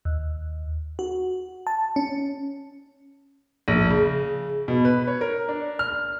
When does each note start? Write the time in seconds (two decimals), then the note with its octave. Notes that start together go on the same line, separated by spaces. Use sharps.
0.05 D#2
0.99 F#4
1.67 A5
1.96 C#4
3.68 A#1
3.90 C#3
4.68 B2
4.85 B4
5.07 C#5
5.21 A#4
5.48 D4
5.79 F6